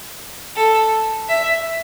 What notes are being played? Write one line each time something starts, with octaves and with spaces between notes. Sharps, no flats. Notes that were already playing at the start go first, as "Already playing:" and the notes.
A4
E5